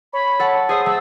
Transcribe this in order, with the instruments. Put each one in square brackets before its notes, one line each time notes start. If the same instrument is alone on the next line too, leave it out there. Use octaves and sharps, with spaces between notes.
[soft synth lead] C#5 [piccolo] B5
[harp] A4 F#5 A5
[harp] G#4 C5 E5 [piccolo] D#6
[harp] A3 [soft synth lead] A5 [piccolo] E6